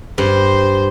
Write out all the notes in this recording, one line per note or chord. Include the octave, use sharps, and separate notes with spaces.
G2 C5